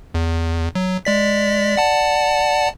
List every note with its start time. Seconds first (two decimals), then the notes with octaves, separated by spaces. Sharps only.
0.14 E2
0.75 F#3
1.05 G#3 D5 B6
1.76 D5 F#5 A5